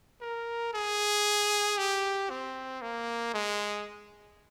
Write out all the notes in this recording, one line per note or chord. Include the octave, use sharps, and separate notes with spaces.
A#4
G#4
G4
C4
A#3
G#3